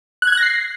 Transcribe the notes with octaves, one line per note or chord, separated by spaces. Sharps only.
F#6
G#6
F#6
A#6
C7